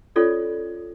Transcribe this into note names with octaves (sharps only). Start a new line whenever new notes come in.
C#4 F4 A4 C#5 D5